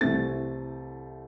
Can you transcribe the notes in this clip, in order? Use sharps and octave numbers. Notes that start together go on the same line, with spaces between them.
C2 C3 E3 A3 C4 A6